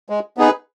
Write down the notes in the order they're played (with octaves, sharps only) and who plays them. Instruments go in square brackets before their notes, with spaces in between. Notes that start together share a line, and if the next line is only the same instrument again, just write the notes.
[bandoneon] G#3
B3 D#4 G#4 B4